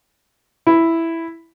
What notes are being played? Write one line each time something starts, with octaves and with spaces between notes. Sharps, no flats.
E4